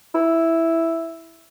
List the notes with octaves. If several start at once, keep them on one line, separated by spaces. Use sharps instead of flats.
E4